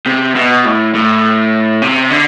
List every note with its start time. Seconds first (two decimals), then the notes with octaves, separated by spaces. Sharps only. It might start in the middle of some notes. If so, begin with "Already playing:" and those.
0.07 C3
0.36 B2
0.65 A2
0.94 A2
1.82 C3
2.10 D3